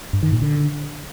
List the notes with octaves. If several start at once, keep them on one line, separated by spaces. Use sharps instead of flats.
G2
D#3
A#2
D3